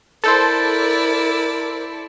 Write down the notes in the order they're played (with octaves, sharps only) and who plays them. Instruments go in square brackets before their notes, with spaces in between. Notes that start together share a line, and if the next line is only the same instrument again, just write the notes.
[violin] E4 D5 [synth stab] A4 C5 [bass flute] A#4 [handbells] G6 A6